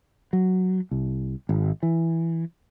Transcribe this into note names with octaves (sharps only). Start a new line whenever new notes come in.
F#3
C2
G#1
E3